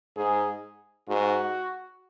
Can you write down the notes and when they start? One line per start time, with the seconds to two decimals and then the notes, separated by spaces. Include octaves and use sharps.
0.16 G#2 G#4
1.08 G#2 F#4